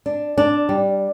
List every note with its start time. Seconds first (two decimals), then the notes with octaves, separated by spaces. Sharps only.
0.06 D4
0.38 D4
0.69 G3